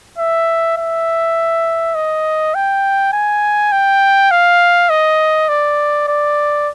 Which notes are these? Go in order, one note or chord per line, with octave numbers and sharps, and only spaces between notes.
E5
E5
D#5
G5
G#5
G5
F5
D#5
D5
D5